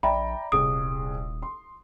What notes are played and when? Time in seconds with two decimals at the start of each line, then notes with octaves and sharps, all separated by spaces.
0.03 A#1 D5 E5 G5 A#5 B5
0.52 D#1 C2 G#4 D#6 D7
1.42 C6